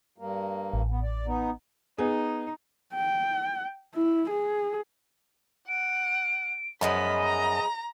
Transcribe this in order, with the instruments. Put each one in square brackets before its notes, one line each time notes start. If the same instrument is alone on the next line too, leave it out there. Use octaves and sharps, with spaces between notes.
[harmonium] G2 A#3
[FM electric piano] A1
[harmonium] B3
D5
B3 D#4
[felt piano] B3 G#4 [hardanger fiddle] D#4
[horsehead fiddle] G5
E4
G#4
[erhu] F#5 [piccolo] D7
[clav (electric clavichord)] F#2 [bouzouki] F3 G#3 B3 [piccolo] D#5 [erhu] B5
[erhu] A#5